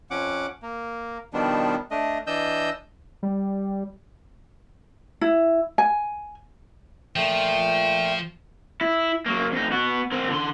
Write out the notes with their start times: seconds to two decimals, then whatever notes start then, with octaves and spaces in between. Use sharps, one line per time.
0.11 F2 C#4 F#5 D6
0.62 A#3
1.33 B2 D#3 F3 G3 B3 D4
1.91 A3 D4 D#5
2.27 E3 D4 D#5 E6 G6
3.23 G3
5.21 E4
5.78 G#5
7.16 A#2 F3 A3 G5
8.81 E4
9.26 F#3 A#3
9.52 F2 D#4
9.71 B3 F#4
10.12 C4 A#4
10.30 D3 C6